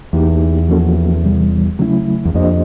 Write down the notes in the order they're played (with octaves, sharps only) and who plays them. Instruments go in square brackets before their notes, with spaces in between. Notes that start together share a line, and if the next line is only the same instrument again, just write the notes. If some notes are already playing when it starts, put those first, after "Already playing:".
[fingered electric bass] E2 [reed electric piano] A#3 D#4 G4
[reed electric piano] F3 A#3 C#4 F#4 A4
C3 E3 G3
C#3 F#3 A3 C#4 E4
[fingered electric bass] E2
[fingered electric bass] F2 [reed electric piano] A#3 D4 G4 C5 D#5